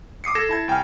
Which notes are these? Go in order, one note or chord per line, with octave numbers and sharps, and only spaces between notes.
D6 D#6 C7 C#7
A4 G#6 A#6 E7
E4 A5 G#6
C2 G5 G#5 F6